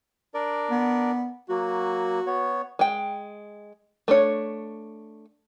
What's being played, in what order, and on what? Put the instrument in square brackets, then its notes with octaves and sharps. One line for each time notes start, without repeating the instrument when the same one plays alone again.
[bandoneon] D4 A#4 D5
[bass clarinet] B3
[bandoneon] F#3 A#3 [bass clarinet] F#4
[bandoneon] B3 C#5
[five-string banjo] G#3 G5
A3 D4 C#5